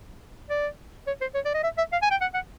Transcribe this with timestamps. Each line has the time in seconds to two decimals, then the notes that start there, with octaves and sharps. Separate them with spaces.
0.50 D5
1.07 C#5
1.21 C5
1.35 C#5
1.45 D5
1.54 D#5
1.64 E5
1.78 E5
1.92 F5
2.02 G#5
2.11 G5
2.21 F#5
2.34 F#5